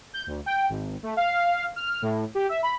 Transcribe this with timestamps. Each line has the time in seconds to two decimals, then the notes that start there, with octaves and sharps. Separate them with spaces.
0.14 G6
0.27 D2
0.46 G5
0.69 G#1
1.03 A3
1.17 F5
1.76 F6
2.02 A2
2.35 G4
2.49 E5
2.63 B5